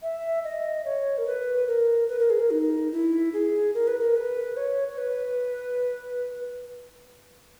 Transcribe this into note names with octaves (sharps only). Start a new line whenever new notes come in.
E5
D#5
C#5
A#4
B4
A#4
B4
A#4
G#4
A#4
D#4
E4
G#4
A#4
B4
A#4
B4
C#5
C#5
B4